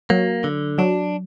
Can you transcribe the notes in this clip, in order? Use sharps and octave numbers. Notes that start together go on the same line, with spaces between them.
F#3 A#3
D3
F#3 D4